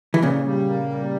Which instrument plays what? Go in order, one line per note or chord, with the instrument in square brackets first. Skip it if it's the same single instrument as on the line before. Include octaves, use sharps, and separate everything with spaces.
[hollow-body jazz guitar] E3
[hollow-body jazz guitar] A#2 C#3 [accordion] G3
[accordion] G3
A#3
G3